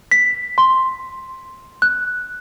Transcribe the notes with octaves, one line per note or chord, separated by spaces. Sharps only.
B6
C6
F#6